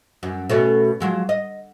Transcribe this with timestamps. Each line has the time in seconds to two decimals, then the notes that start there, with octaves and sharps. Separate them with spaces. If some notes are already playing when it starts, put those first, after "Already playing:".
0.23 F#2
0.50 B2 A3 C#4
1.00 F3 F#3 G#3
1.29 D#5